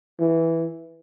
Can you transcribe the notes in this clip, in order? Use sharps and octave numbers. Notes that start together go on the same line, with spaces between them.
E3